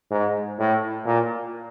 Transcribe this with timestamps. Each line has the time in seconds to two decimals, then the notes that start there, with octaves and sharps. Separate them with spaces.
0.11 G#2
0.59 A2
1.05 A#2